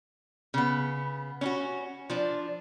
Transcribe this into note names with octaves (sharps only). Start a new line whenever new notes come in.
C#3 B3
C#4 D#4 F#4
F3 D4